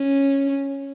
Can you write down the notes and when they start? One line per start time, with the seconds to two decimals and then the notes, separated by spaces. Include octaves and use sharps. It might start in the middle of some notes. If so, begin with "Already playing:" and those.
Already playing: C#4